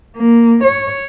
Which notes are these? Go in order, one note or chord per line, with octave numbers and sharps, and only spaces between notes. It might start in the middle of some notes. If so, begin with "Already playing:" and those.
A#3
C#5